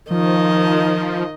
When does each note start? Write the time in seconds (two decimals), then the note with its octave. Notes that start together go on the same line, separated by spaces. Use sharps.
0.11 D#3 F3 D#5